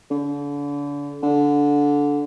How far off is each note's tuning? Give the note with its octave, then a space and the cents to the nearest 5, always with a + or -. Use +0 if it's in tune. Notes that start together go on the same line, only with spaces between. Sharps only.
D3 -35
D3 -15